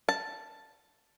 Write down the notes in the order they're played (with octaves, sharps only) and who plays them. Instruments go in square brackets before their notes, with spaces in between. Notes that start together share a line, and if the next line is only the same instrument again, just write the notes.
[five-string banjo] A5